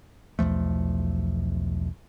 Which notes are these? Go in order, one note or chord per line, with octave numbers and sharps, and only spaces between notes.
B1 E2 F3 A3